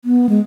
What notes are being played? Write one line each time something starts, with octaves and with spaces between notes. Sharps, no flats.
B3
G#3